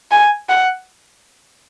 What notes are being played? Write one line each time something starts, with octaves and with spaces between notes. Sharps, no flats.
G#5
F#5